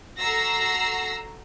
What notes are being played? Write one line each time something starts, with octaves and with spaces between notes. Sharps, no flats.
F#4 A4 A#5 E6 A#6 C7